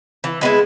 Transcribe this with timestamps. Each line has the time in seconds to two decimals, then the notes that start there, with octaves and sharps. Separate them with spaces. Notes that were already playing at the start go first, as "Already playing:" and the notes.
0.24 E3
0.41 G#3 B3 E4